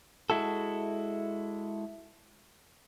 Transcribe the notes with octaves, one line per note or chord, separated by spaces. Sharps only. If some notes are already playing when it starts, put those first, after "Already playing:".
G#3 E4 F#4 A4